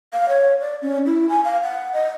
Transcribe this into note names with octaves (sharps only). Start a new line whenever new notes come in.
F5
C#5
D5
C#4
E4
G#5
F5
F#5
D#5